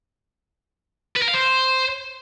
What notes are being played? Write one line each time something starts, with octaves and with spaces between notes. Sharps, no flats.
B4
A#4
F5
C5